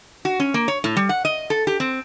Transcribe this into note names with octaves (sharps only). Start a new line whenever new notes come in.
F#4
C#4
A#3
C#5
A2
G3
F#5
D#5
A4
G4
C4